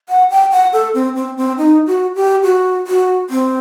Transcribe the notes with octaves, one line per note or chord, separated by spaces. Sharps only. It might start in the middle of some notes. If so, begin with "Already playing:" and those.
F#5
G5
F#5
A4
C4
C4
C4
D#4
F#4
G4
F#4
F#4
C4